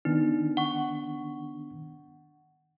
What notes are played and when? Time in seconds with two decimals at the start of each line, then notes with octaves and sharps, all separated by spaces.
0.05 D#3 B3 D4 D#4
0.57 F#5 C#6